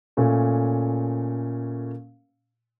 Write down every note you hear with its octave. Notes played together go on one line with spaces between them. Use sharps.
A#2 A3 C#4 A#4